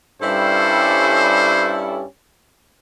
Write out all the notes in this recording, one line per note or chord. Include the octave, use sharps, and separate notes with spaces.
G2 G3 C#4 E4 A4 C5